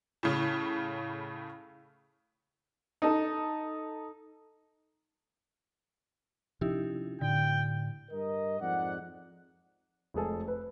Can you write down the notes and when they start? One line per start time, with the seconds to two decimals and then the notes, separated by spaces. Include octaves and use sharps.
0.23 A2 C#3
3.02 D#4 A4
6.61 C3 F3 C#4 D#4 E4 G4
7.21 A2 D3 G5
8.12 G2 A#4 D#5
8.60 F2 G#2 D5 F#5
10.14 F1 G#3 G#4 A4
10.48 B4